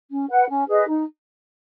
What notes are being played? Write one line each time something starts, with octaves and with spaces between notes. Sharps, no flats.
C#4
B4 F#5
C#4
G#4 B4 D#5
D#4